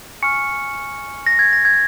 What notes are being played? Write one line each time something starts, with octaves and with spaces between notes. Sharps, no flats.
G#5 C#6 F6 C#7
A#6
G#6
A#6
G#6